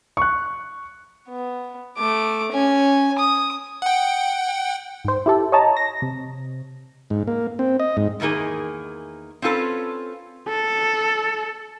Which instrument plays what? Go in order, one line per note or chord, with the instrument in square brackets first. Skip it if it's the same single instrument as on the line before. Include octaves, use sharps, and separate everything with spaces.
[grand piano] C#6 F#6
[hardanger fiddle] B3
A3 D6
C#4 G#5
D#6
[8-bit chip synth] F#5 G5
[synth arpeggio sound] G#2 C5
E4 G4 A4
C#5 D#5 A5 A#5
A#6
C3
[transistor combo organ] G#2
A#3
C4
D#5
G#2
[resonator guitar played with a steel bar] E2 B2 D#3 A#3 G#4
C4 C#4 F4 A4 B4
[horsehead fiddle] A4